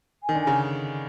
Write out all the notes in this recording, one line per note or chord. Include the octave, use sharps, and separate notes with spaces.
G#5
D#3
D3
G#5
C#3